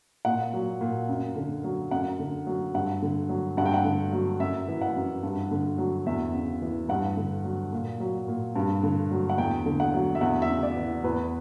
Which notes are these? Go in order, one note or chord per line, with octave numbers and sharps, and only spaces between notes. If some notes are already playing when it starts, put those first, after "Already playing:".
A#2 F#5
F#3
A#2
F#2
D3
F#3
F#2 F#5
D3
F#3
G2 F#5
D3
F#3
G2 F#5
G5
F#5
D3
F#3
F#2 E5
E3
F#5
F#2
G2
D3
F#3
E2 E5
C#3
E3
G2 F#5
D3
F#3
A#2
F#3
A#2
G2
D3
F#3
F#5
E2 G5
D3
F#5
F#3
E5
E2 F#5
E5
C#3
D5
E3
E2 B4